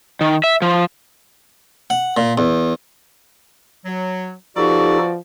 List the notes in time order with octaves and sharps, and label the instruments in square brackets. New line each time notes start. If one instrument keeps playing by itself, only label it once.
[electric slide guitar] D#3
E5
F3
[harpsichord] F#5
A#2
E2
[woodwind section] F#3
[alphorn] F3 [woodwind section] B3 F#4 D5 [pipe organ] D#4 G4 A4 [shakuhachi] C#6